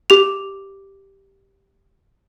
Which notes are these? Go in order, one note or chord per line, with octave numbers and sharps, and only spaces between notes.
G4 F7